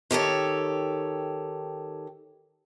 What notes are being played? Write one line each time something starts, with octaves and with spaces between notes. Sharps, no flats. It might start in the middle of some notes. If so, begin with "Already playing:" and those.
D#3 G4 A4 C#5